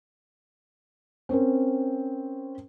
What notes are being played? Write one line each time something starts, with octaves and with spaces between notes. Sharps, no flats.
C4 C#4 A#4 C5